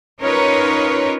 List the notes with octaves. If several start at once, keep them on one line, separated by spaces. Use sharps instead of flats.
C#4 D#4 F4 A#4 B4 C#5